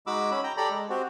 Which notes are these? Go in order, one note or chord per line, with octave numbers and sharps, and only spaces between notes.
G#3 D#4 F#4 B5 D6 E6
C#4 B5
G5 A#5
G4 A4 D5 A#5 B5
G#3
C4 F#4 G4